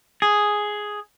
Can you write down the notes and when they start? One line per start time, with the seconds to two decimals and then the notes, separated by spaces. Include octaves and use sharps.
0.22 G#4